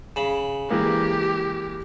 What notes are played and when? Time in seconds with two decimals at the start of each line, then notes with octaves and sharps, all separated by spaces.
0.16 C#3 B5
0.70 E3 G#3 A#3 G4